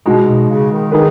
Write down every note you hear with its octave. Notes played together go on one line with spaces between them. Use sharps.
B2 G#3 D#4 F#4
B2
C#3
D#3
D#3 D#4 G#4 B4